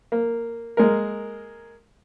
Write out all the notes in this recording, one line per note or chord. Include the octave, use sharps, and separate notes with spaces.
A#3
G#3 A#3 A#4